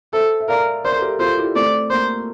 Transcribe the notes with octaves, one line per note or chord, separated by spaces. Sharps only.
A4 C5 E5
E5
A#4 D5 F5
A#4 C5 D5
A4
G4 A#4
F4 A4 C5
E4 G4
A3 C4 D5
A#3 C5